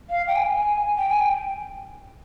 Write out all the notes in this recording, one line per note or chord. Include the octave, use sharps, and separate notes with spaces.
F5
G5
G#5
G#5
G5
G#5
G5